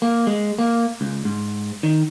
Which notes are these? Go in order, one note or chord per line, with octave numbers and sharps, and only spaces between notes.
A#3
G#3
A#3
C#2
G#2
D#3